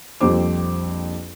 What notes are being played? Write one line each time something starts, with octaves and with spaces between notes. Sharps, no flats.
A#1 F2 G3 C4 C5 D6